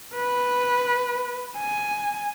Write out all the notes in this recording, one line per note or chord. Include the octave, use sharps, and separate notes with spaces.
B4
G#5